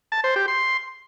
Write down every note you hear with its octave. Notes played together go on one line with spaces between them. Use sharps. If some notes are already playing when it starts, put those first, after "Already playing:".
A5
C5
G4
C6